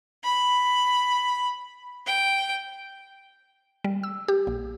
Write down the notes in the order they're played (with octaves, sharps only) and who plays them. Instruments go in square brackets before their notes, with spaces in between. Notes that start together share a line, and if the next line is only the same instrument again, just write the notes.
[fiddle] B5
G5
[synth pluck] G3
E6
G4
A#1